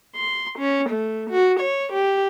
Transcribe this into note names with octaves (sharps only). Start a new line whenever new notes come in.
C6
C#4
A3
F#4
C#5
G4